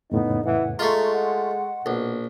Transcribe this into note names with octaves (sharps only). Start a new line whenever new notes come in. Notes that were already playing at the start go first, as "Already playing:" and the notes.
F2 A2 C#3 B3 D#4
E3 F#5
G#3 A3 F4 A#5 C6 C#6
F#5
A#1 B2